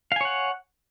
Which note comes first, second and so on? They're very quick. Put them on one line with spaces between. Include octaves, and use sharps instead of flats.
F5 G#5 C#5 F#5